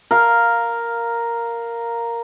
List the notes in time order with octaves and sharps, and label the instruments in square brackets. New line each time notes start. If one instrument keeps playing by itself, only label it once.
[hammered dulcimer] A#4 F5